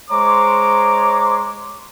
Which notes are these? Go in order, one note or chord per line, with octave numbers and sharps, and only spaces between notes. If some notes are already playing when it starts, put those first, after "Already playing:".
G#3 C5 C#5 A#5 C6 D6